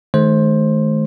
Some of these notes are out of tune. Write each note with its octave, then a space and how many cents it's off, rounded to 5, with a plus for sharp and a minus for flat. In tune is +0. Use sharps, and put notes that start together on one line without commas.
D#3 +0 A3 -40 C5 +15